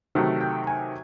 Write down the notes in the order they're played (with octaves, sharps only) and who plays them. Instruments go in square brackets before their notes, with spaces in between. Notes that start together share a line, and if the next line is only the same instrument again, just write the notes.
[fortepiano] C3 D#3 F#3 A3
G5
G#5